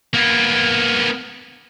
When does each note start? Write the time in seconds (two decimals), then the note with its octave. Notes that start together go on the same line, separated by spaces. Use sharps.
0.14 A#3 B3